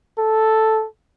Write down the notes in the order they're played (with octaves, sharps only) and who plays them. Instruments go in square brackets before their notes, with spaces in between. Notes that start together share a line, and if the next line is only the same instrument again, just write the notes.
[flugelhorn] A4